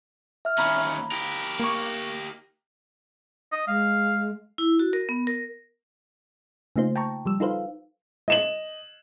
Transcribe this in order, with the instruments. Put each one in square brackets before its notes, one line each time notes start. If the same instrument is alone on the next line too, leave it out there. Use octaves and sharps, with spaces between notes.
[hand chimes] E5 F6
[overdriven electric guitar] D#2 C#4 [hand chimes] A#5 B5
[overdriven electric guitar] G4 A#4
[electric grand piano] A#3 C#6
[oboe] D#5
[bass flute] G#3 [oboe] F5
[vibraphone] E4
F#4
A#4
B3
A#4
[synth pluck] C#3 A3 A#3 D#4 F4 C5
G5 A5 A#5 C#6
F3 G3 E6
D#4 F4 A4 B4 C5 F5
[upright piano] D#5 E7 F#7